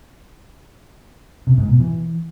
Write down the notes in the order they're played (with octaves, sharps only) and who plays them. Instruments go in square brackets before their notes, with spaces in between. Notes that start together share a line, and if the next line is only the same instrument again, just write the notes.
[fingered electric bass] C3
G#2
B2
E3